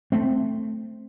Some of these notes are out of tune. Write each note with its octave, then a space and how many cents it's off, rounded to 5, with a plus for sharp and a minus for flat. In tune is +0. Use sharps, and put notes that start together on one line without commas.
A3 +0 C4 +0